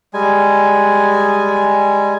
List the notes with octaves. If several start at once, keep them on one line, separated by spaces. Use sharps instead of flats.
G3 G#3 G#5